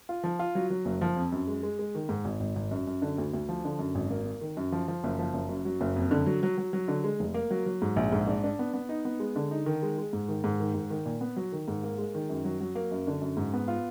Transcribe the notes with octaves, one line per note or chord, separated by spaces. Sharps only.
F4
F3
F4
F#3
F#3
F#1
F3
F2
F#2
G#3
G#3
G#3
D#3
G#2
G#1
G#1
G#1
F#2
F#2
D3
D2
D2
F3
D3
F#2
G#1
A#3
A#3
D#3
F#2
F3
F3
F#1
F3
F#1
F#2
F#3
F#1
F2
D3
F#3
F#3
F#3
F#3
D3
G#3
F1
A#3
F#3
F#3
G#2
A#1
G#2
D4
D4
B3
B3
D#4
B3
G#3
D3
D#4
D#3
G#3
G#3
G#2
D#3
G#2
D#3
G#2
D#3
A#2
B3
F#3
D#3
G#2
A#3
G#3
D#3
F#2
F#3
F#3
A#3
F#2
D3
F#2
G#2
B3
F4